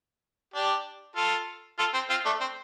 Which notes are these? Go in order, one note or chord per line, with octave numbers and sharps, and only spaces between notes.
D4 G4
F4 A4
F4 A4
C4
C4 F4
A3 D4
C4